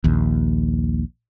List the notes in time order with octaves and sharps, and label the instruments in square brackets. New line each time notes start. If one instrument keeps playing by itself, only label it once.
[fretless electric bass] A#1 D#2